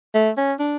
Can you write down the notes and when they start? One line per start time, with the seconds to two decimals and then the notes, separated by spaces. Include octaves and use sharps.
0.14 A3
0.37 C#4
0.59 D4